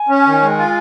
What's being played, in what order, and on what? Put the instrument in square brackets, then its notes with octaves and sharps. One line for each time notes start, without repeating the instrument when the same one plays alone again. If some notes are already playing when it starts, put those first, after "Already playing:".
Already playing: [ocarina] G#5
[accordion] C#4
D#3
G#3
F4